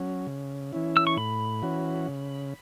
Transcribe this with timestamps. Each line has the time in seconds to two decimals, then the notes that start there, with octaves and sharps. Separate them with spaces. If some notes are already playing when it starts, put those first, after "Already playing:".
Already playing: F#3 C#4
0.27 C#3
0.73 E3 C#4 E4
0.97 E6
1.07 C#6
1.17 A2 B5
1.62 E3 C#4 F#4
2.08 C#3